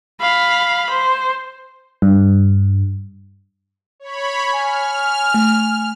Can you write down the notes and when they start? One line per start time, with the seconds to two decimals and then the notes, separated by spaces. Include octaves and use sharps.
0.20 F5 B5
0.90 C5
2.02 G2
4.00 C#5 B5
4.53 G#5 F6
5.34 A3